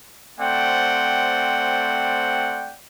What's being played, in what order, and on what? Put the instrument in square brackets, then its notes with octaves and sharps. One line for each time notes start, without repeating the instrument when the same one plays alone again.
[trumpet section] A3 C4 C5 D5 F#5 G5